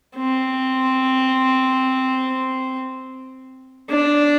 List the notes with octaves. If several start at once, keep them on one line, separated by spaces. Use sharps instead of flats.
C4
D4